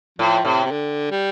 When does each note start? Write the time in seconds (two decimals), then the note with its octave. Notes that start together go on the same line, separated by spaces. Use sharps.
0.19 A2 F3
0.45 A2 C3
0.65 C3
0.71 D3
1.11 G3